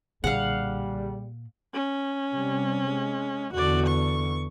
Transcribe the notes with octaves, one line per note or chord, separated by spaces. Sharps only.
B1 A#2 D3 G3 G#4 F5 F#5
C#4
C3 G3 C4
G#3
E2 D3 F#4 D5
C#6